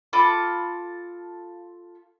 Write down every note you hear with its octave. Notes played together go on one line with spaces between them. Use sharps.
F4 A4 B5 D6